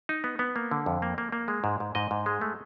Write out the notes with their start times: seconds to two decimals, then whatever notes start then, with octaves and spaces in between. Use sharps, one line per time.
0.09 D#4
0.24 B3
0.39 B3
0.56 A#3
0.71 D3
0.86 F2
1.02 A#3
1.18 A#3
1.32 A#3
1.48 G#3
1.64 G#2
1.80 G#2
1.95 G#2 D#5
2.11 G#2
2.26 G#3
2.41 A3